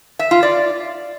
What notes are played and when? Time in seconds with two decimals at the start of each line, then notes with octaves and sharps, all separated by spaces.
0.19 E5
0.31 F4
0.43 D5